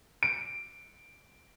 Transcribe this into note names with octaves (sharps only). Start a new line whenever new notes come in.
D7